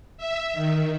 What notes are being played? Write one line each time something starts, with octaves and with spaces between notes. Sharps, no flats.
E5
D#3